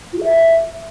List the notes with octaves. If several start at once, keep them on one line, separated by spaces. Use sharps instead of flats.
F4
G#4
E5